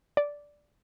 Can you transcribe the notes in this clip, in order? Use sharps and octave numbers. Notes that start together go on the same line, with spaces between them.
D5